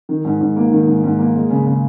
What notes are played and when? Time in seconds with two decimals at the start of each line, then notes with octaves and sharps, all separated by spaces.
0.09 D#3
0.25 G#2
0.41 G#2
0.56 A#3
0.72 D#3
0.87 G#2
1.03 G#2
1.19 A#3
1.35 G#3
1.50 C#3
1.66 C#3